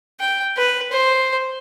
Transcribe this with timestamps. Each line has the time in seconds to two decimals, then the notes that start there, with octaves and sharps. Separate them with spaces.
0.20 G5
0.57 B4
0.92 C5